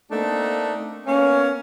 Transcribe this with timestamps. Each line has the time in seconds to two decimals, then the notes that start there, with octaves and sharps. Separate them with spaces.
0.11 A3 A#3 C4 D4 D#4
1.06 A#3 B3 C#4